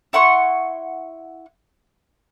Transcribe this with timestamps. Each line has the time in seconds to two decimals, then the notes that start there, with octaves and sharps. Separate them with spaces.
0.13 E4 F#5 C6 C#6